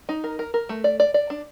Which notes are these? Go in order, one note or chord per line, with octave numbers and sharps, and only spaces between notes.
D#4
A#4
A#4
A#4
A3
D5
D5
D5
D4